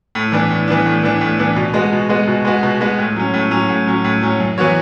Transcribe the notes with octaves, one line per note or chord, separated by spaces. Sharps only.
A2
E3 B3 D4
A2
E3 B3 D4
A2
E3 B3 D4
A2
E3 B3 D4
B2
G#3 B3 F#4
B2
G#3 B3 F#4
B2
G#3 B3 F#4
B2
G#3 B3 F#4
A2
F#3 C#4
A2
F#3 C#4
A2
F#3 C#4
A2
F#3 C#4
F#2
E3 B3 F#4 C#5